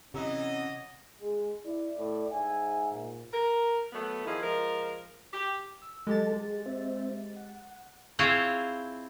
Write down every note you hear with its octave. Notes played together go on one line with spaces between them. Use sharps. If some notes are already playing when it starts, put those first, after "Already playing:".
C3 E3 F#3 C#4 D#5
G#3 G#4
E4 D5
A2
G#2 E5 G#5
A#2
A#4
F#3 A3 B3
D#3 F3 E4 G#4
F3 G#3 A#4
G4
E6
F#3 G#3 G4 A4 A5 A6
G#4
C4 C5 E5
F#5
C4 E4 F4 G#4 C5 C#5